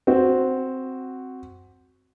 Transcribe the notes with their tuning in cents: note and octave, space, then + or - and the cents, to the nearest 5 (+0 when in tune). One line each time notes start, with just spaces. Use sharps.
C4 +0 F#4 +0